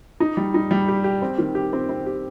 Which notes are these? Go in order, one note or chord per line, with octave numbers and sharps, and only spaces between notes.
D#4
G3
D#4
G3
G4
G4
C4
D#3
G4
C4
C4
G4